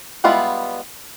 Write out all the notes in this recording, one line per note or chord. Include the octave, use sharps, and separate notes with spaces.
G3 G#3 B3 E4 F4